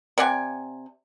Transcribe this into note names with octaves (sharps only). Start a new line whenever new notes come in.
C3 D5 F#5 G#5